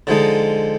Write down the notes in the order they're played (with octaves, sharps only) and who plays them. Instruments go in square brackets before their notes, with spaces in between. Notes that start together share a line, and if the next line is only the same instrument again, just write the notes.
[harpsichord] D3 F3 G#3 D#4